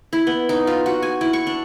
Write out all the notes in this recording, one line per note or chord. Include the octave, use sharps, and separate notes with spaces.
E4
B3
D#4
F4
F#4
G#5
E4
C#6
D4